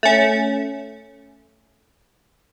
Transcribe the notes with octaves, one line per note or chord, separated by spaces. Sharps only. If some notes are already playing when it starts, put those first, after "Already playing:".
A3 C#4